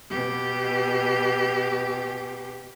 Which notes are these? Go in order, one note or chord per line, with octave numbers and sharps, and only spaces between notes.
B2 G4